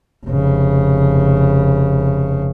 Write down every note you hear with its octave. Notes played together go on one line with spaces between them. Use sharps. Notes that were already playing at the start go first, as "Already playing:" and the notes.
F1 C#3